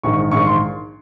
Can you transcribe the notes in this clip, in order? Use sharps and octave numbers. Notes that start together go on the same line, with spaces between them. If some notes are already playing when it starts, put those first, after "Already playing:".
A#1 G#2 D#3 C#6
A#1 G#2 D#3 C#6
C6